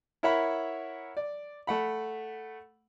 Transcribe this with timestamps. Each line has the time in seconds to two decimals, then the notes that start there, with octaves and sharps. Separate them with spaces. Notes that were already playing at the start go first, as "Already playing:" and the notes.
0.23 E4 A#4 C#5 E5 F#5 B5
1.17 D5
1.67 A3 F#5 B5